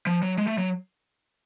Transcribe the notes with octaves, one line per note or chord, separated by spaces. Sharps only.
F3
F#3
G#3
A3
F#3